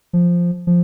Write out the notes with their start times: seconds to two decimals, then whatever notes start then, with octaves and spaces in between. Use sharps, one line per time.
0.13 F3
0.67 F3